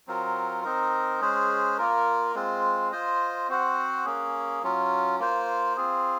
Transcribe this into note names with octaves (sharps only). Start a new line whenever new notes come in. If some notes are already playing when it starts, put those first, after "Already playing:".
F#3 C4 F4 A#4
C4 D#4 A#4
G#3 C#4 G#4 C5
A#3 F4 A#4
G#3 C4 F4
F4 C5 D#5
C4 F#4 C5 F#5
A#3 C#4 G#4
F#3 C#4 F4
A#3 F4 C5
C4 F4 G#4